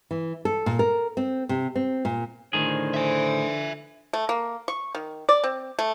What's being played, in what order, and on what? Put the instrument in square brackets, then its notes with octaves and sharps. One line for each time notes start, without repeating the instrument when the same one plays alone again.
[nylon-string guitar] E3
A4
A#2
A#4
C4
C3
C4
A#2
[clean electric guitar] A2 D#3 G#4 [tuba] D3 [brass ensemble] C5
[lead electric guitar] E5 G#5
[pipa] A3
A#3
C#6
D#3
D5
C4
A3